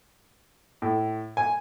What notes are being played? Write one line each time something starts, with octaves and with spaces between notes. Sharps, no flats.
A2
G#5